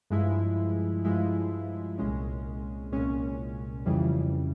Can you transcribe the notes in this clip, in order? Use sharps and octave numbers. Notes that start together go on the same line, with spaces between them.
G2 F3 G#3 E4
G2 F3 G#3 E4
C2 A#2 G#3 C#4
C2 A#2 G#3 C#4
F2 C#3 E3 G3